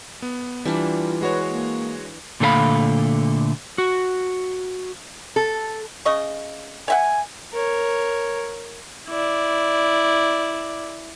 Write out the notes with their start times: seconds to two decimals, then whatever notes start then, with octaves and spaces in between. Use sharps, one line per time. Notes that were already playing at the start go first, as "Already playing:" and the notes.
0.22 B3
0.65 E3 G3 D4 F4
1.21 G#3 F#4 B4 C#5
1.48 A#3
2.40 A#2 D3 A3 A4 F5 B5
3.78 F#4
5.36 A4
6.05 C#3 D#5 C#6
6.88 C#5 E5 F#5 G#5
7.52 A#4 C#5
9.08 E4 D5